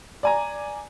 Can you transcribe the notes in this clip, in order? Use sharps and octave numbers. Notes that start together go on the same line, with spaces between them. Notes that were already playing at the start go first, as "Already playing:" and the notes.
D5 G#5 A#5